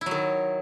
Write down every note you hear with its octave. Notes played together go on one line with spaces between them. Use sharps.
D#3 F#3 E4